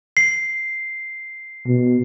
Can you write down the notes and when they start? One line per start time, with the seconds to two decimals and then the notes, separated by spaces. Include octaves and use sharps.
0.17 C7
1.67 B2